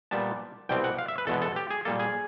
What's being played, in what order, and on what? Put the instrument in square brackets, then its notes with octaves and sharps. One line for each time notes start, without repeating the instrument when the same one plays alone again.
[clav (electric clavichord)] A#2 G3 B3 A5
C2 B2 G3 C4 G5
F#5
F5
E5
B4
E2 B2 G#3 B3 A4
A4
G4
G#4
A#2 G3 A#3 A4
G#4